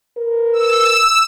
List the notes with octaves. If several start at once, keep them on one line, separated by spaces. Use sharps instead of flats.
A#4 B4
E6